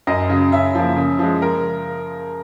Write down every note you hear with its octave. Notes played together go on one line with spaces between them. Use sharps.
F#2 D#5
C#3 F#3
C#3 E5
F3 A#3
C#3
F3 G#3
A#4